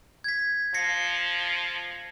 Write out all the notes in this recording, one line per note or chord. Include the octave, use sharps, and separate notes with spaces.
G#6 B6
F3 A#6 C7 C#7